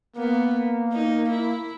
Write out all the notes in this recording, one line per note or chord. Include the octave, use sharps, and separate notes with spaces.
A#3 B3
D#4
E4